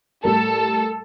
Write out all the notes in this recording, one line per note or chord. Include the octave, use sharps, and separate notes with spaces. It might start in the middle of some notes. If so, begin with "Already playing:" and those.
A2 G3 A4 A#4